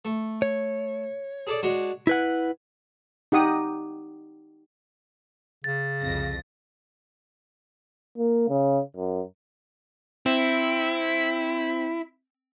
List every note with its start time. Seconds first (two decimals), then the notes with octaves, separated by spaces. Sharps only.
0.05 A3
0.42 C#5
1.47 G#4 A4 D5
1.63 G#3 D4 F#4
2.07 E4 B4 F#5 G#5
3.32 D#4 G4 F#5 D#6
5.64 C#3 A6
6.02 C2 F2 A#6
8.18 A#3
8.49 C#3
8.96 F#2
10.26 C4 E4